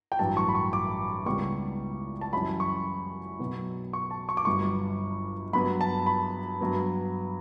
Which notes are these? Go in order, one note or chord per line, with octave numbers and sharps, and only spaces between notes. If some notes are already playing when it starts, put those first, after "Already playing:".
G5
A1 G2 F#3 A5
C#6
B5
C#6
D6
C#2 C#3 G3 B3 C#6
A5
F#2 E3 G3 C#4 B5
C#6
B1 B2 F#3 B3
C#6
A5
C#6
D6
G1 G2 F#3 C#6
G2 F#3 B3 B5
A5
B5
G2 F#3 B3